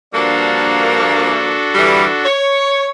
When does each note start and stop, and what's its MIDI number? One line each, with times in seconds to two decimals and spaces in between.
0.13 1.59 43
0.13 1.59 53
0.13 1.59 58
0.13 2.27 62
0.13 2.27 66
0.13 2.27 69
1.75 2.05 50
1.75 2.05 52
1.75 2.05 55
2.24 2.87 73